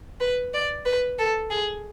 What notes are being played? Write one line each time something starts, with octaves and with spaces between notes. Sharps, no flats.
B4
D5
B4
A4
G#4